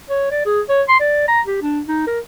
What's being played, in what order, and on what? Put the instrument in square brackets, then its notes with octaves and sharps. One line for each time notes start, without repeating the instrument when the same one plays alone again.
[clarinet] C#5
D5
G#4
C#5
C6
D5
A#5
G4
D4
D#4
A#4